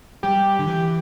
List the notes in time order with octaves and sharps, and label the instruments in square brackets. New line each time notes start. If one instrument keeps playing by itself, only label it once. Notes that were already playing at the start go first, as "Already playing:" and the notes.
[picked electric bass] G3 [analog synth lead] G4
[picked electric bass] D3
E3